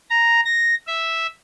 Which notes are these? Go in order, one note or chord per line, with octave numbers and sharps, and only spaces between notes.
A#5
A#6
E5